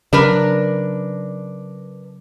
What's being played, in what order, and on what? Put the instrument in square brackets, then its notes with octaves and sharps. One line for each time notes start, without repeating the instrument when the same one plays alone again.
[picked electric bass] C#3 F#3 [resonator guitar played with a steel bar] D4 A#4 B4